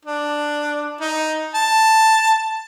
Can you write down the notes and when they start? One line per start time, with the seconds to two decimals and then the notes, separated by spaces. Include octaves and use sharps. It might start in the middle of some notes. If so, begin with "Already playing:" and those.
0.05 D4
1.01 D#4
1.55 A5